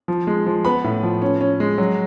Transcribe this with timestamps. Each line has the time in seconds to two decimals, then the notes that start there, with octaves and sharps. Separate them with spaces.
0.08 F3
0.27 G#3
0.46 F3
0.65 B3 B5
0.84 A2
1.03 F3
1.22 C#4
1.41 C#4
1.60 G#3
1.78 F#3